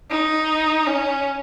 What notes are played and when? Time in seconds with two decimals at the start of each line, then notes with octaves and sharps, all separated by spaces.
0.10 D#4
0.86 C#4